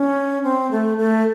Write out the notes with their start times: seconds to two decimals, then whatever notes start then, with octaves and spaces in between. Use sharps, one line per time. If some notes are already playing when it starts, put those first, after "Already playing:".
Already playing: C#4
0.43 C4
0.71 A3
0.98 A3